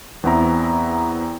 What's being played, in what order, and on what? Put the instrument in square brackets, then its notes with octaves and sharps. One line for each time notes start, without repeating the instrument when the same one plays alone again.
[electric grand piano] E2 B3 C4 E4 A#5